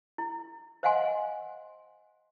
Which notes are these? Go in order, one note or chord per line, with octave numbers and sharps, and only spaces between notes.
E4
C5 D#5 F5 F#5 G#5 C6